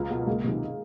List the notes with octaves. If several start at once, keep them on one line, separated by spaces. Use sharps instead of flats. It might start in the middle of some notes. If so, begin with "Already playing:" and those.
Already playing: C#2 A#3
B2
C#2 G#3 A#3
C3 D#3